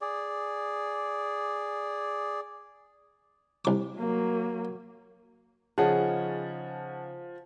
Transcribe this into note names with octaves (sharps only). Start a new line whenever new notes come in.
G#4 D5
C2 D6
F#3 A#3
C#3 F3 D#4 G#4 C#5 F#5 A5